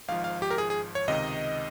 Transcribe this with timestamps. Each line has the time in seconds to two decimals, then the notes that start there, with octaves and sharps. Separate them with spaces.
0.08 G#1 G#2 F3 F5
0.24 F5
0.42 G4
0.51 A#4
0.58 G#4
0.70 G#4
0.95 C#5
1.07 C#2 C3 D#3 D#5